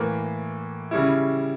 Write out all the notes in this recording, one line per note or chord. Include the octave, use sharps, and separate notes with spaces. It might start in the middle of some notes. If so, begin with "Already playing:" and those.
Already playing: A2 E3 A#3
C#3 G3 C#4 E4